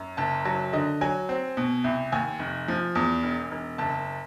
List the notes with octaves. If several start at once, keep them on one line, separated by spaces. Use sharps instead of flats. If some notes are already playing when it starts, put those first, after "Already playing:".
Already playing: F#2
F#1 A5
F#3 A5
D3 D#5
F#3 G#5
C4
B2
C2
D#2 G#5
F1
F3
E2
E1
E1
F#1 A5